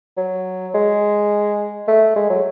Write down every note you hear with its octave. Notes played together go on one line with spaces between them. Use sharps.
F#3
G#3
A3
G#3
F#3